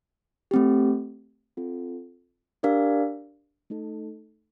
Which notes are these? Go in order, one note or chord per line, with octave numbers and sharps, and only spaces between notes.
A3 C4 G4
C4 F4 A4
D4 G4 A#4 D5 F5
A3 D#4 A4